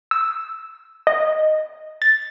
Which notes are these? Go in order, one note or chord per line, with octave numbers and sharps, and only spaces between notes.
E6
D#5
A6